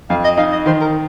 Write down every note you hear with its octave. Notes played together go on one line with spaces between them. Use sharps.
F2 F5
D#5
D#4 F5
D#5
D#3 C5
A#4